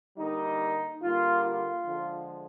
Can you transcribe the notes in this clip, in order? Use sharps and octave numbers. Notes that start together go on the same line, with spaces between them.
D3 G3 A#3 D#4
D3 G3 A#3 F4
F4
D3 F3 G#3